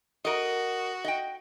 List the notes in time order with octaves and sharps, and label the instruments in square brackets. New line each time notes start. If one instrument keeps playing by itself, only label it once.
[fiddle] F#4 [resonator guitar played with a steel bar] A#4 D#5
[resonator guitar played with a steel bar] D#5 G5